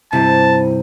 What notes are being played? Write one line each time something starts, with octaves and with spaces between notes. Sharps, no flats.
G2 C3 C4 D#4 E4 A5